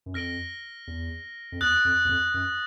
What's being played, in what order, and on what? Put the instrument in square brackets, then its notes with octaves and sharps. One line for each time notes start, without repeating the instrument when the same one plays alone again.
[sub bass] F#2
[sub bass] F2 [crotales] F6 A#6 D7 G7
[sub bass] E2
F2
[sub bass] E2 [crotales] D#6 F#6 A6
[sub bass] F2
E2
F2
F#2